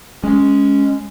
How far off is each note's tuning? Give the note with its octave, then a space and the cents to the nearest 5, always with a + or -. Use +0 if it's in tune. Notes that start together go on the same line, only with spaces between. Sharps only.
G#3 +0 C#4 +0